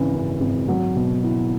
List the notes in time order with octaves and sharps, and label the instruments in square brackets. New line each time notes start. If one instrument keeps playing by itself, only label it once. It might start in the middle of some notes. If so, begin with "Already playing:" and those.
Already playing: [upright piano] G#1 C#3 E3
F#2
G#1
F#3
B2
E4